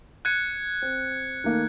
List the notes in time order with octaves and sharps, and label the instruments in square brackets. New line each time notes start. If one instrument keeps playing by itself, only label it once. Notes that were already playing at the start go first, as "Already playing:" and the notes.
[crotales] F#6 G#6 C#7 [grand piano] D#7
[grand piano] C4
D#3 A3 A#3